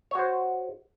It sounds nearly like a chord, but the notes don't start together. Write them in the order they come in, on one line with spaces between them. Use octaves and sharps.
C#5 F#4 C5